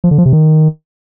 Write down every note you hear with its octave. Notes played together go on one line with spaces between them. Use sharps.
F3
D3
F3
C3
D#3